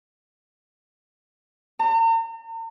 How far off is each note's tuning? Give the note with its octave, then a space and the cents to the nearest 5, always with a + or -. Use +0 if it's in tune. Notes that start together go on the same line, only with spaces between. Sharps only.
A#5 -45